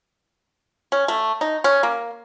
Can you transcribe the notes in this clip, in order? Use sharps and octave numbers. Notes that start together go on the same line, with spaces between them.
C#4
A3
D#4
C#4
A#3